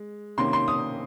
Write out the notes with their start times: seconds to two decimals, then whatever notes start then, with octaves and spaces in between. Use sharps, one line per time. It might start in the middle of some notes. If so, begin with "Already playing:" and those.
Already playing: G#3
0.37 C3 D#3 A#3 C#4 C6
0.53 C6
0.68 D#6